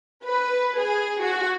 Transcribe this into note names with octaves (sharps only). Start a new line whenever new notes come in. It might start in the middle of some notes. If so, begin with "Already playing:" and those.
B4
G#4
F#4